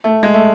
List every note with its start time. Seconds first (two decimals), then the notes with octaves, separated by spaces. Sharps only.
0.04 A3
0.23 G#3
0.34 A3